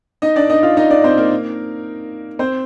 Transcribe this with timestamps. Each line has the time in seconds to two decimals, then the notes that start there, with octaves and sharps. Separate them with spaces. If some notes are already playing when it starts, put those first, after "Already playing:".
0.22 D#4 D#5
0.36 D4 D5
0.50 D#4 D#5
0.63 F4 F5
0.77 D#4 D#5
0.90 D4 D5
1.04 C4 C5
1.17 A#3 A#4
2.39 C4 C5